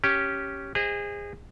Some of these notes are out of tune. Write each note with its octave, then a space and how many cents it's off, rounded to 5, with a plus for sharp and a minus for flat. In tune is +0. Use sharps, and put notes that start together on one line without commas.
C#4 +0 G4 -5
G#4 -30 C5 +0 D#5 +0